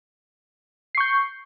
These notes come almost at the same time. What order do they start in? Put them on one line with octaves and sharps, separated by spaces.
C7 C#6 G6